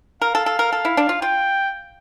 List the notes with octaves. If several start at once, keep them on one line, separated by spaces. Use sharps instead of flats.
A#4 F5
A4
A4
A#4
A4
E4
D4
F4
F4 G5